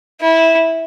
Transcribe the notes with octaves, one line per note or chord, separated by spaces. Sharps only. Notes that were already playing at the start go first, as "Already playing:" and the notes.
E4